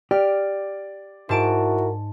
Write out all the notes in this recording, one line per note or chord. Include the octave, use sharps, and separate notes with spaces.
G4 D5 F6
G#2 E4 F#4 A#4 A5 D7